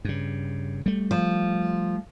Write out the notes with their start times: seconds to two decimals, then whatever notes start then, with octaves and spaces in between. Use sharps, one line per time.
0.05 G2 C#3
0.86 G3 A3
1.11 F3